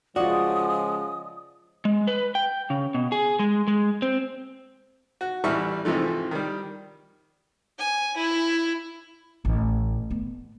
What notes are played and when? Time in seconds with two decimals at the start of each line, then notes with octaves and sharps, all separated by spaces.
0.16 C#3 F3 G#3 F4 F#4 D5 D#6
1.85 G#3
2.07 B4
2.35 G5
2.70 C#3
2.94 B2
3.12 G#4
3.39 G#3
3.68 G#3
4.02 C4
5.21 F#4
5.44 A1 E3 G3 E5 C#6 F6
5.85 G#2 C3 E3 F3 A3
6.31 D#3 G3
7.79 G#5
8.17 E4
9.45 A1 A2
10.10 A3 B3